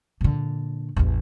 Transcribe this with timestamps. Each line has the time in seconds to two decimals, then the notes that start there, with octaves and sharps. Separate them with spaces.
0.21 A#2 D3
0.96 A1 E2